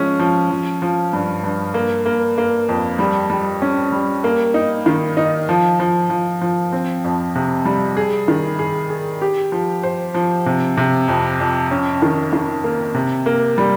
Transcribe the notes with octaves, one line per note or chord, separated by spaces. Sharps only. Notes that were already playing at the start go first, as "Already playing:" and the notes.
Already playing: F3 G#3 C#4
F3
F3
F3
G2
G2
A#3
A#3
A#3
F2
G3
G3
C#4
G3
A#3
D#4
D#3
D#4
F3
F3
F3
F3
C4
F2
C3
G3
G#4
D#3
G#4
G#4
G4
F3
C5
F3
C3
C3
F2
F2
C#4
D#3
D#3
A#3
C3
A#3
G3